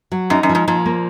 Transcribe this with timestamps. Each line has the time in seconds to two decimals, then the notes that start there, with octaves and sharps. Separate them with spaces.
0.12 F#3
0.30 F#2 D#4
0.43 F#2
0.49 F3
0.55 G#2
0.68 A#2 F3
0.86 A#3